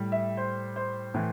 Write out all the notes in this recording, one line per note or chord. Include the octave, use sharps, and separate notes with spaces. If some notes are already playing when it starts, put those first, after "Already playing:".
Already playing: A2 G3
E5
C5
C5
A2 E3